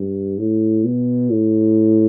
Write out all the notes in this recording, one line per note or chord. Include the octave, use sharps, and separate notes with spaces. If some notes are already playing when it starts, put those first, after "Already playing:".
Already playing: G2
A2
B2
A2